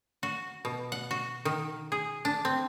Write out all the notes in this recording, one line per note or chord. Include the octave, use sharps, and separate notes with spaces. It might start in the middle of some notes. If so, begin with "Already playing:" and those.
F#4
B2
F#5
F#4
D#3
G#4
D4
C4